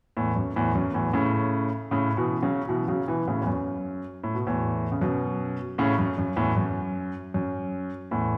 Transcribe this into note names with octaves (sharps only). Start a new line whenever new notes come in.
E2 A2
F#2
E2 A2
F#2
E2 A2
A2 C#3
A2 C#3
B2 E3
C#3 F#3
B2 E3
C#3 F#3
B2 E3
A2 C#3
E2
F#2
A2
B2
E2 A2
C#3
F#2 B2
A2 C#3
F#2
F#2
E2 A2
F#2
F#2
E2 A2